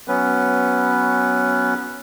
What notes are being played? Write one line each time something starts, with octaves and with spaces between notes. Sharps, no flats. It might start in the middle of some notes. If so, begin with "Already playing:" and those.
F#3 B3 C#4 B4